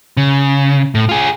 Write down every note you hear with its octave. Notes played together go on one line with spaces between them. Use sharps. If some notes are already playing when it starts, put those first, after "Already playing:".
C#3
A2
F4 G#4